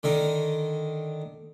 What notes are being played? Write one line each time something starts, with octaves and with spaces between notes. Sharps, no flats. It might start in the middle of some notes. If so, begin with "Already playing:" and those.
D3 D#3 D#4